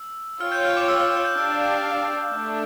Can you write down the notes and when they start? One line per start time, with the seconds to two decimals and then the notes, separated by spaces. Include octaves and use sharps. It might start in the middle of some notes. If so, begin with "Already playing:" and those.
Already playing: E6
0.40 F4 C#5 G5 F6
0.52 G6
0.65 F6
0.77 D6
0.88 E6
1.00 F6
1.13 G6
1.25 G6
1.37 D4 G4 D5 F5 E6
1.61 G6
2.34 A3 D4